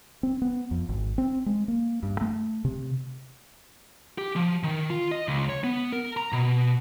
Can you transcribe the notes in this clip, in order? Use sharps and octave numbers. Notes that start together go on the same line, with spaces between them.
C4
B3
F2
G#1
C4
G#3
A#3
G2
A3
C3
G4
F3
D#3
F4
D#5
C#2
C#5
B3
A#4
A#5
B2